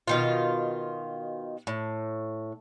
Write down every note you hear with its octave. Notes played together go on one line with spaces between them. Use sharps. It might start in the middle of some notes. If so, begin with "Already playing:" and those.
B2 D#3 F4
A2